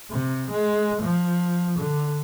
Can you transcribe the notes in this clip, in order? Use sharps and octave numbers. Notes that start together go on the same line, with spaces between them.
C3
G#3
F3
D3